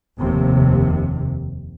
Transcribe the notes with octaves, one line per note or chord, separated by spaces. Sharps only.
F1 D#2 C3